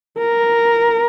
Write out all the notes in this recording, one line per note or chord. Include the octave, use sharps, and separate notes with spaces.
A#4